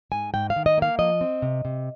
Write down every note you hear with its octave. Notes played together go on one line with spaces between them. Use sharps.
G#2 G#5
G#2 G5
F5
D#3
D#5
A#3 F5
F3 D#5
C4
C3
C3